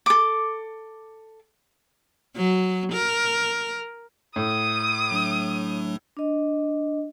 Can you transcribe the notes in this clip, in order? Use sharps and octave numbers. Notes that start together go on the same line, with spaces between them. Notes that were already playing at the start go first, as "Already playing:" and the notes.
A4 D6
F#3
A#4
A2 D#6
F#3 A3 D4
D4 D#5